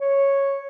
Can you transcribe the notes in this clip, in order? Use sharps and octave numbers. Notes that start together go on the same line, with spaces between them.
C#5